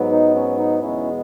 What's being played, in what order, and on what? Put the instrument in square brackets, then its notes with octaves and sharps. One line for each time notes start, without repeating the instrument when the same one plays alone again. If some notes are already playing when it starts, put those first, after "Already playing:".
Already playing: [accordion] G#2 F#3 B3
D#4
C#4
D#4
E2 B2 G#3 B3 C#4 E4